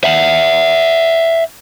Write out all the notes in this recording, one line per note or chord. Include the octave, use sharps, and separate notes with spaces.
E5 F#5